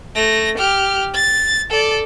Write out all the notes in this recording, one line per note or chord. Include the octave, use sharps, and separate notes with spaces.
A3 A#6
G4 F6
A6
A4 D5